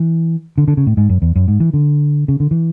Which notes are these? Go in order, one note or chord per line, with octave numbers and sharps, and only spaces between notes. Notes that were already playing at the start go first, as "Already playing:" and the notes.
Already playing: E3
D3
D3
C#3
A2
G#2
F#2
E2
F#2
G#2
E3
D3
C#3
D3
E3